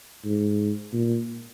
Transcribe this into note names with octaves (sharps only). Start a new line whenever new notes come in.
G#2
A#2